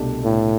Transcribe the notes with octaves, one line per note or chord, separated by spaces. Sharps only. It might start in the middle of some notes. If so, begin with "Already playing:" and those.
Already playing: C2 B2 A3 D4 G4
A2